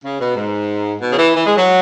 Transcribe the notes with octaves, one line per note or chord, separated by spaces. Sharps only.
C#3
B2
G#2
B2
C#3
E3
E3
G#3
F#3